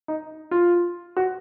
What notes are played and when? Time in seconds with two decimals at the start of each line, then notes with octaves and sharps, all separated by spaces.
0.08 D#4
0.51 F4
1.17 F#4